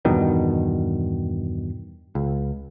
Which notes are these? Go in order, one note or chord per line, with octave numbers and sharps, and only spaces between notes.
E2 G2 B2 D#3
C#2